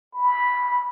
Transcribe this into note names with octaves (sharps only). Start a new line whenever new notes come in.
B5